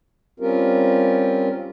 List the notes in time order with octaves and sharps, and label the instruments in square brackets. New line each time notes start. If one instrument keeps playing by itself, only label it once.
[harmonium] G3 C4 C#4 F4 G4 A#4